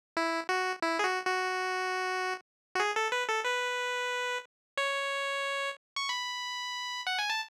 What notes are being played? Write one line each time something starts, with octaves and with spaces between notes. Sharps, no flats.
E4
F#4
E4
G#4
F#4
F#4
F#4
G#4
A4
B4
A4
B4
C#5
C#6
B5
F#5
G#5
A5